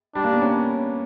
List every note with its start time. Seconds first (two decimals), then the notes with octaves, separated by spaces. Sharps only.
0.15 G3 D4
0.24 A#3
0.33 B3
0.42 C#4